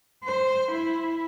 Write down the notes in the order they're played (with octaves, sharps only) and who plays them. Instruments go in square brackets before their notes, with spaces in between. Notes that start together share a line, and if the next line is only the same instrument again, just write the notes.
[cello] C5
E4